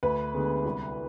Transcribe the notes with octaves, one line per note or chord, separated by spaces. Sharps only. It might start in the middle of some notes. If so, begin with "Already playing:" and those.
D2 B4
D3 G#3 B3
C2